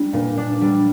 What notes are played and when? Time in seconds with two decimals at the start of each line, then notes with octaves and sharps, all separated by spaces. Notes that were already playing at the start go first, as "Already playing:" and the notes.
Already playing: G3 D4
0.13 A#2
0.37 D4
0.61 G3